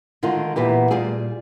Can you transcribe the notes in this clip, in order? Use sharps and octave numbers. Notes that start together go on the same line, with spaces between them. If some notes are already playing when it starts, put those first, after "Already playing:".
D3 D#3 G#3 F4
E2 A#2 B3 G4
A#2 G3 F4 G#4